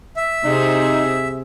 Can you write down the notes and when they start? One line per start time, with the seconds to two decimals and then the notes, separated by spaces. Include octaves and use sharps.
0.16 E5
0.45 C3 C4 D#4 G#4